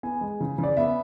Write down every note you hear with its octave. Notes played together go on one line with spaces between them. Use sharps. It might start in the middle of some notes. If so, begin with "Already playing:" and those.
B3 G#5
G#3
C#3
C#3
D5
B3 E5